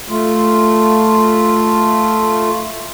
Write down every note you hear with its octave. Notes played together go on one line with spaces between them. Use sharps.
A3 F4